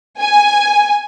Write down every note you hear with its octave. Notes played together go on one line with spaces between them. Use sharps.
G#5